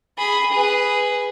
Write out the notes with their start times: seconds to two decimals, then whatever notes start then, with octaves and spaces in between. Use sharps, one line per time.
0.17 G#4 B5
0.52 G#4 B4